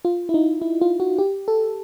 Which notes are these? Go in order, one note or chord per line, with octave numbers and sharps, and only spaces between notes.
F4
E4
D#4
E4
F4
F#4
G4
A4